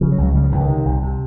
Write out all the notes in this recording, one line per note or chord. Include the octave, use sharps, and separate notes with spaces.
C#3 F3
F#3
C#2
F#3
C#3 G3
F3
C#2 E3
D#3
C3
C2
C3